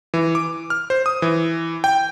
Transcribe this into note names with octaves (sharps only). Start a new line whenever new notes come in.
E3
D6
F6
C5
D#6
E3
G5